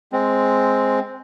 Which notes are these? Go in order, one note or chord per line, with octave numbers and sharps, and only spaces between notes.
G#3 C4